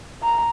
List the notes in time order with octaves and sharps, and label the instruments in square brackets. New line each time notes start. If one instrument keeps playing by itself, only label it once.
[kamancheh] A#5